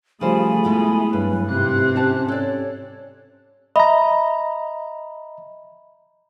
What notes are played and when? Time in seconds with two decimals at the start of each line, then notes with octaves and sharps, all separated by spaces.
0.21 C#3 F3 G3 A3 G#4 C5 G#5 B5
0.65 B2 G#3 E4
1.13 G2 F#3 B4
1.49 G#2 C3 C4 G4 F#6
1.96 C#4 C5 D#5 A5
2.28 A4 C#5 D5
3.76 D#5 E5 A#5 B5